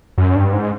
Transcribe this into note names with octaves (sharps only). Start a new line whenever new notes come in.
F#2
G2
G#2